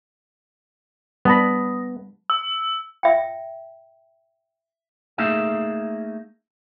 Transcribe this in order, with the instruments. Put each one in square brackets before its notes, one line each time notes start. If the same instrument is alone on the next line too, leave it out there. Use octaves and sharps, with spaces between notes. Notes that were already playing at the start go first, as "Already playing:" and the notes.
[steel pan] G3 A5 B5 [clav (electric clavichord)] B3 [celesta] D#6 A#6
[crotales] E6
[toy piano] E5 G5
[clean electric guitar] A3 A#3 D#4 G#4 E5 F5